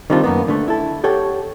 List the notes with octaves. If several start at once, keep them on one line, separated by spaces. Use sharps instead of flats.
D#3 G3 C4 D4 F4
F#2 A#3 B3
D3 A3
E4 A4
G4 A4 C#5 F#5 G5